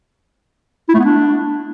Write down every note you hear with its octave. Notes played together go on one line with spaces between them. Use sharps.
E4
A3
B3
D4